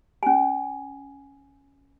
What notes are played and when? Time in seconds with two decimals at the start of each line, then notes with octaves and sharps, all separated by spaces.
0.23 C#4 G#5